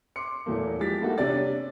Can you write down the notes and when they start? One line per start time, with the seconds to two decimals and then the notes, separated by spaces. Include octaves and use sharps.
0.16 C6 D6 C#7
0.46 E2 E3 F#3 A3 A#3
0.80 F3 G#3 G4 A6 B6
1.00 E3 G3 A3 A#3 D#4 F#4
1.18 C3 C#4 D4 D5 A6